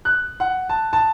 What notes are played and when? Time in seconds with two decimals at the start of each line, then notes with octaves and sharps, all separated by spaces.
0.05 F#6
0.40 F#5
0.69 A5
0.93 A5